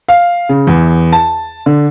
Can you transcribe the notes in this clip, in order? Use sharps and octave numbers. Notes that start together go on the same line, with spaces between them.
F5
C#3
E2
A5
D3